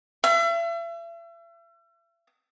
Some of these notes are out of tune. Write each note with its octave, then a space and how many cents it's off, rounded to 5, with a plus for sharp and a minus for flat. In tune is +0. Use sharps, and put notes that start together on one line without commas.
E5 +40